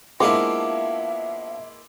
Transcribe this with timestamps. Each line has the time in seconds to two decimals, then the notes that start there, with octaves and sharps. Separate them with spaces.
0.20 F3 G#3 A#3 B3 D4 E4 E5 D6